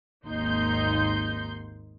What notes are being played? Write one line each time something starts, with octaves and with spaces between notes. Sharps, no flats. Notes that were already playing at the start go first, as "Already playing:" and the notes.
G#1 D#2 D#4 C6 G6